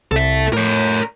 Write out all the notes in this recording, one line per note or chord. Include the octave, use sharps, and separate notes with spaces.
C2 A4 E5
A2 A#4 C#5